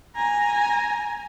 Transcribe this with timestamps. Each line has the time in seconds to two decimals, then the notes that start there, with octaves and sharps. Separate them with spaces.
0.16 G#5 A#5